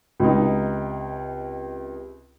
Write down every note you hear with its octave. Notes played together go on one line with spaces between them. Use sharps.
C#2 C3 D#4